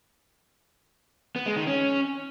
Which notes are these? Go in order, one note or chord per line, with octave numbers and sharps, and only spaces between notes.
B3
G#3
D#3
C#4